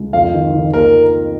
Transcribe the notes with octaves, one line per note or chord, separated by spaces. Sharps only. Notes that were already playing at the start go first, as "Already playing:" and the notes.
Already playing: C#2
F2 F5
D#3
D#3
A#3 A#4